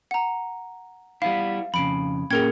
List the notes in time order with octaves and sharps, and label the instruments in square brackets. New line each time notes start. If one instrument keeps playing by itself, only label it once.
[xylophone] F#5 A#5
[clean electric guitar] G3 B3 E4 [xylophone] F5
[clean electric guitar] F2 C#3 [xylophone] B5 D7
[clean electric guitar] A#2 C#4 G5 [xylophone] G#4 A#4 G#6